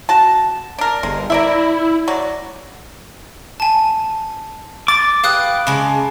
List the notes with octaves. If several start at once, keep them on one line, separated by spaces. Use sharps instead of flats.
F#4 A5
D4 A#4
G1 G#3
E4 A#4 D5 E5
F#3 F#4 D5
G#5 A5
D6 A6 D7
G4 B4 F5 D#6 F#6
C#3 G#3 A5